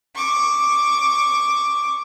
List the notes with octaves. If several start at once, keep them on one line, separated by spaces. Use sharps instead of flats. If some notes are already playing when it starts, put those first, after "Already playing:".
C#6 D6